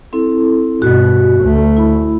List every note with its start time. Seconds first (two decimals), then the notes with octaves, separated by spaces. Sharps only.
0.13 C4 E4 A4
0.82 G2 B2 F#4
1.42 D2 A3
1.77 E4 B5